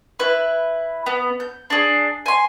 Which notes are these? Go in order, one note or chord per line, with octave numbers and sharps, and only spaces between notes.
E4 B4
B3
G6
D4 G#4
G#5 C6